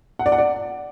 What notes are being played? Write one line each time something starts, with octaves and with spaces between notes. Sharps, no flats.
F#5
D5
F#5
D5